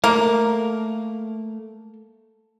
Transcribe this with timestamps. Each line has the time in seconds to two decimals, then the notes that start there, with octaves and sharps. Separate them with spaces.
0.04 A3 A#3